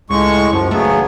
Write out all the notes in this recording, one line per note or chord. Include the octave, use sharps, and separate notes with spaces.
C#2 A2 G#3 C#6
F#2 F3
C#3 F#3 A3 B3
A1